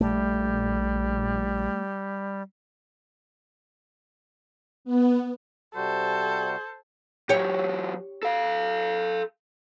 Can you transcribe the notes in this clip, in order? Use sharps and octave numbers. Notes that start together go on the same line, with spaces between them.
A#1 G3 A3
B3
C3 G3 F#4 A4 C5
E3 F#3 G4 C#5
A4 F5